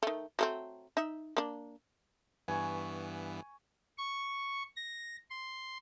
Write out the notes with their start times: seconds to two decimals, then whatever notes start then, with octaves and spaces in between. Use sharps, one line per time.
0.03 D#3 A3
0.39 F#3 A3 C4
0.97 D#4 E5
1.37 A#3 D4
2.48 G2 E3 B3 G#5 C#6
3.98 C#6
4.76 A#6
5.30 C6